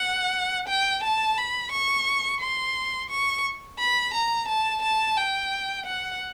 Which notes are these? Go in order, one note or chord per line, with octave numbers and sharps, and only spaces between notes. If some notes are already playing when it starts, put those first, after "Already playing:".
Already playing: F#5
G5
A5
B5
C#6
C6
C#6
B5
A#5
A5
A5
G5
F#5